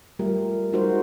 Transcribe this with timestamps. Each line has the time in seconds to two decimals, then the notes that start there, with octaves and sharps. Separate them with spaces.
0.19 G3 A3 F4 G4 A#4
0.72 G3 G#3 D#4 F#4 A#4 C5